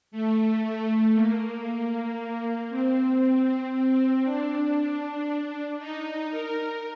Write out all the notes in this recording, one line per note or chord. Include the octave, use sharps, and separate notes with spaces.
A3
A3
A#3
C4
C4
D4
D#4
A#4